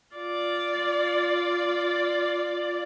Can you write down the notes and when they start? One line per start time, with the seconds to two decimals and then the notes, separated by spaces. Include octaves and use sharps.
0.15 F4 D5